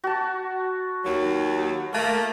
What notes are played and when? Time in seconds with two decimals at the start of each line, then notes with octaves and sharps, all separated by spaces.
0.04 F#4 A5
1.05 D#2 F#3
1.93 A3 A#3